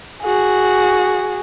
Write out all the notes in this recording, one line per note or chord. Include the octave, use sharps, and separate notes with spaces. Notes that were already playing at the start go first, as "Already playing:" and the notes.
F#4 G#4